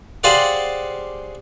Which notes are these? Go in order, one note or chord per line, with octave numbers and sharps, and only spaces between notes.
G4 G#4 C5 D5 F5 F#5